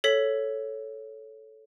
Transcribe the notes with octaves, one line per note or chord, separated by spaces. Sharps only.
A4 C#5 B6 F#7